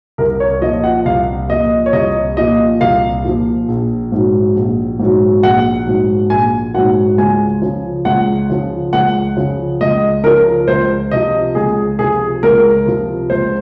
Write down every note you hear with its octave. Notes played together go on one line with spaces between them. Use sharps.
C2 A#4
C#5
A#2 F3 D#5
F#5
C2 F5
A#2 F3 D#5
C#5
C2 D#5
A#2 F3 D#5
C2 F5
A#2 F3
A#1
G#2 F#3
A#1
G#2 F#3
A#1 F#5
G#2 F#3
A#1 G#5
G#2 F#3 F#5
C#2 G#5
C#3 F3
C#2 F#5
C#3 F3
C#2 F#5
C#3 F3
C#2 D#5
C#3 F3 A#4
C#2 C5
C3 F3 D#5
C#2 G#4
C3 F3 G#4
C#2 A#4
C3 F3
C#2 C5